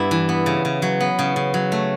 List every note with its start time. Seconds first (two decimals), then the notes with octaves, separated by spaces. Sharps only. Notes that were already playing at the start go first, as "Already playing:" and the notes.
Already playing: G2 B3 E4
0.11 E3
0.29 B3
0.46 C#3
0.65 C#3
0.82 F#3
1.00 B3
1.19 C#3
1.36 C#3
1.54 F#3
1.72 A3